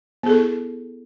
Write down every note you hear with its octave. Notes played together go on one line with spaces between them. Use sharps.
B3 E4 G#4 A4